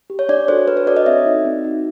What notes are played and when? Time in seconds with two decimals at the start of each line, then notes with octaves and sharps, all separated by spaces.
0.10 G4
0.19 C#5
0.29 D4 D5
0.48 F#4 A4 C5
0.67 D4 B4
0.77 C#5
0.87 F#4 A4 D5
0.96 D#5
1.06 C4 E5
1.26 D#4 F#4
1.45 C4
1.64 D#4 F#4